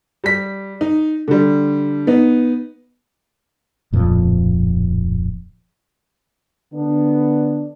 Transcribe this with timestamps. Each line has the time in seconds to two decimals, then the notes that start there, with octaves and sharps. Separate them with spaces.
0.24 G3 B6
0.81 D#4
1.28 D3 G3
2.07 B3 D#4
3.92 D1 F2 A#2 F3
6.73 D3 B3 D4